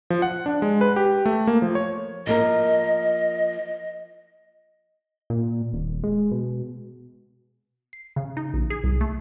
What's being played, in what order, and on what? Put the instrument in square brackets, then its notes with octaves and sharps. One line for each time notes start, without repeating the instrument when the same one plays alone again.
[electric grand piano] F3
F#5
D4
G#3
B4
G4
A3
A#3
F3
C#5
[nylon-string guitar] F3 A#3 A#4 [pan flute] D#5
[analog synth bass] A#2
D#1
G#3
B2
[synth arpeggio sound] C7
C#3
D#4
A#1
G#4
C2
A3